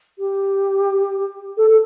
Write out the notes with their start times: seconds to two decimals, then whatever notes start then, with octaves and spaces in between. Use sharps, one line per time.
0.18 G4
1.57 A4
1.70 A4